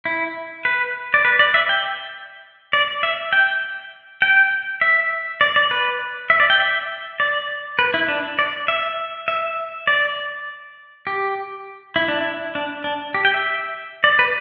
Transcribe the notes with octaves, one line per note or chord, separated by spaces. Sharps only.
E4
B4
D5
B4
D5
E5
G5
D5
E5
G5
G5
E5
D5
D5
B4
E5
D5
G5
E5
D5
B4
E4
D4
D5
E5
E5
D5
G4
E4
D4
E4
D4
D4
G4
G5
E5
D5
B4